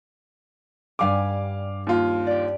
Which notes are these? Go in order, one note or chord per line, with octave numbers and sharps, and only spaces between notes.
G2 G3 F5 G#5 D6
D#2 F4
G4 D5